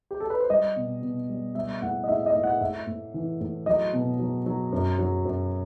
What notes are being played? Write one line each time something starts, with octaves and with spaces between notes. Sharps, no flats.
G4
A4
B4
C5
G3 D#5
B2
B2
G3
G3 E5
A2 F#5
D#5
A2 E5
D#5
A2
F#5
A2 E5
A2
E3
A2
F#3 D#5
B2
F#3
F#3
F#2
F#3
F#2